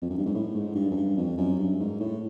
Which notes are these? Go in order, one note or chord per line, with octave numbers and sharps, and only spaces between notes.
F2
F#2
G2
G#2
A2
G#2
G2
F#2
G2
F2
F#2
G2
G#2
A2